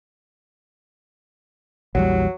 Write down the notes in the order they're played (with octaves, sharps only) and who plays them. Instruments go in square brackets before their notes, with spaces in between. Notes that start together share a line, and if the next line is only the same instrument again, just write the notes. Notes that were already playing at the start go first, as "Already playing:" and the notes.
[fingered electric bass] A#1 E2 G3 [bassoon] F#3